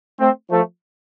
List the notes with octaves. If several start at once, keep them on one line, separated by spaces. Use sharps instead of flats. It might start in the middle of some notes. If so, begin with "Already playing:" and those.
A3 C4
F3 A3